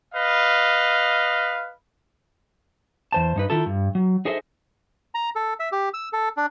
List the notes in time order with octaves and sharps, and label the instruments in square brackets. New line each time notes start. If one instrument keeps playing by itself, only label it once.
[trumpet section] B4 D#5 F5
[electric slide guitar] E2 C5 A5
G2 D#4 B4
D#3 E4 F4 A4
G2
F#3
D#4 G#4 A4 C5 D#5 E5
[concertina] A#5
A4
E5
G4
E6
A4
D4